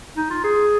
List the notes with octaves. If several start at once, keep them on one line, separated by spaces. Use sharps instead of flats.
D#4
F4
G#4